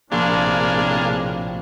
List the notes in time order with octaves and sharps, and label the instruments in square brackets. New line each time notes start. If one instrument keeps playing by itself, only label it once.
[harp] A#1 C6 [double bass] A2 C3 [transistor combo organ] A#3 G#4 F5 [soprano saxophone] D4